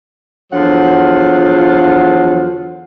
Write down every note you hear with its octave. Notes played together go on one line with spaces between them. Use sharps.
E2 D3 F3 F#3 F4 F#5